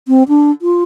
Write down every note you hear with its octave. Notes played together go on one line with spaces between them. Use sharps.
C4
D4
F4